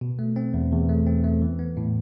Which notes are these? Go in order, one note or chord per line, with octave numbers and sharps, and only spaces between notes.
B2
A3
C4
E2
E2
A3
C4
A3
E3
B3
A2